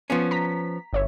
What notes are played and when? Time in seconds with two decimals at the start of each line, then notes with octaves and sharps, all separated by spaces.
0.10 F3 B3 C#4
0.31 A#5 B6
0.93 G1 C#5 E5